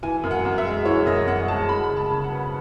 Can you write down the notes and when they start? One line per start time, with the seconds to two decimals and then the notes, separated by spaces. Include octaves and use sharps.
0.03 E3 G#5
0.24 F#2
0.31 F#5
0.45 F#2
0.58 E5
0.65 G#3
0.85 E3 C#5
1.06 F#2 D#5
1.27 F#2 F#5
1.48 G#3 A5
1.68 G#3 B5
1.89 C#3
1.97 A5
2.10 C#3
2.24 F#5
2.31 B3